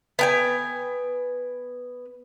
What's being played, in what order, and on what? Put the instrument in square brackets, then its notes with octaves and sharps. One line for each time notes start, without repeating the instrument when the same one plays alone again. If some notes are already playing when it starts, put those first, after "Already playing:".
[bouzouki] B3 G5 G#5